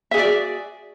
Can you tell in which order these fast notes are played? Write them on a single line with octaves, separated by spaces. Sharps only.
E5 G#4 F#4 D5